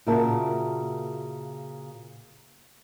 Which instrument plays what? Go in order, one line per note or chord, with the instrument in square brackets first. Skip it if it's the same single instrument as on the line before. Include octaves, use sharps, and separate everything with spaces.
[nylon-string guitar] A#2 C#3 F#4 A#4 E5 A5